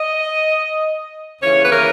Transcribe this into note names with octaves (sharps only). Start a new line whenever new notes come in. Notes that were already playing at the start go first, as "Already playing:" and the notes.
Already playing: D#5
D#2 C#3 E3 C#5
B4
A#4